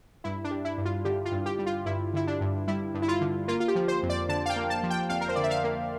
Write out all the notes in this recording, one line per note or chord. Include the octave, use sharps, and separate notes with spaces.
G2 E4
D4
G3
E4
G2
F4
D3 G4
F4
G2
G4
G3
F4
G2 E4
D3 E4
D4
G2
G3 E4
G2
E4
F4
D3
A#3 F4
F4
G4
F3
C5
F2
D5
D3 A5
F5
G5
A#3
A5
F3
G5
F2 F5
A#4
C5
D3 D5
E5
F5
A#3